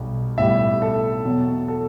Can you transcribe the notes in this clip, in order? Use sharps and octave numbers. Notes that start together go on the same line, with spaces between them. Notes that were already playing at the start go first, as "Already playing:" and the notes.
Already playing: B1 B2 G3
B1 A2 G3 E5
A4
E2 B2 F#3
A4